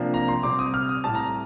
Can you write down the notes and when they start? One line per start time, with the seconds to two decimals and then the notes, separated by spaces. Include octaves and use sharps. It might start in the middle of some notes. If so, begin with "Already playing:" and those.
Already playing: C3 F3 A#3 D4
0.14 A#5
0.28 C6
0.43 C3 G3 C4 D6
0.59 D#6
0.74 F6
0.89 D#6
1.04 A2 G3 C4 A5
1.15 A#5